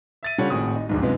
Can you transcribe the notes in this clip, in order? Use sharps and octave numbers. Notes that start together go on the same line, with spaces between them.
E5 A6 D#7
C#3 G3 F4 A4 C#5 F#5
G#1 A2 C4 F#4 G#4 D#6
D#4
D1 A#1 G#2
F#2 C3 G#3 B3 D#4 F4